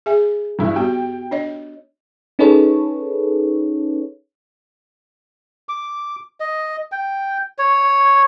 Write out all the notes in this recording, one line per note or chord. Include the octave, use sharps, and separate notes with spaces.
G#4 E5 G#5
G2 E3 E4
B3 F#4 G4 G5
D4 C#5 D#5
C#4 D#4 G#4 A4 B4 C#5
D6
D#5
G5
C#5